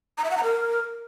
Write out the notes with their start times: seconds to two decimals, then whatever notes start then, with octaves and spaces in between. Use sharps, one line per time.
0.18 A#5
0.24 E5
0.31 F#5
0.37 A#5
0.44 A#4